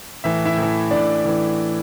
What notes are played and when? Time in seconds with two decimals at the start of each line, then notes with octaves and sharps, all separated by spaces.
0.24 A2 E3 E5
0.45 E4 E5
0.57 A2
0.63 E3
0.91 A2 E3 D4 D5
1.25 A2 E3